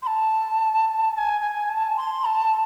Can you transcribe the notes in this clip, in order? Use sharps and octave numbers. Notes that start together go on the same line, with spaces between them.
C6
A5
A5
G#5
G#5
A5
C6
A5